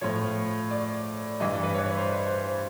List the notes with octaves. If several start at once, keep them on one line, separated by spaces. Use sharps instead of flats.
A2 F3 C#5
D5
G2 E3 D#5
D5
B4
C#5
C#5
C5
B4
C5
C5